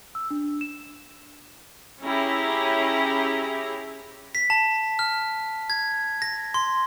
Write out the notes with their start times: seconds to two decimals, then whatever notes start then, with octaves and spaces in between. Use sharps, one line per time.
0.15 E6
0.30 D4
0.61 E7
2.02 C#4 E4 G4 G#4 A#5
4.35 B6
4.50 A5
4.99 F6
5.70 G#6
6.22 A#6
6.54 C6